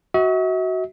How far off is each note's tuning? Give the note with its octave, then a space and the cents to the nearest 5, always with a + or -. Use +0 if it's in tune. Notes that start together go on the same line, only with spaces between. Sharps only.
F#4 +10 E5 -45